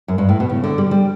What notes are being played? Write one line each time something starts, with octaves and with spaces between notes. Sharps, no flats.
F#2
G2
A2
B2
C#3
D3
G3
G3